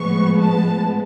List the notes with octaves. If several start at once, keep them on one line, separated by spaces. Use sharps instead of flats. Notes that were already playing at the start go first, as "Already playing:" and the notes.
Already playing: A2 F3 G#3 B3 C#6
A5